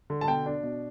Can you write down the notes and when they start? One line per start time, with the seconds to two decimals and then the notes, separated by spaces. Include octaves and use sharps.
0.10 D3
0.21 A5
0.28 B2 G5
0.46 D4
0.63 B2